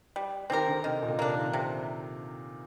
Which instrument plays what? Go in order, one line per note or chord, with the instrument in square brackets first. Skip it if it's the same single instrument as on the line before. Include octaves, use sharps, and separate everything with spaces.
[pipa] G3
[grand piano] D#3 [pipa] C4 G4 A#4
[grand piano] D3
[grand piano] C3 [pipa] D#3
[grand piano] A#2
[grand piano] C3 [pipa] A#3 D4
[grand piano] D#3
[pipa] C3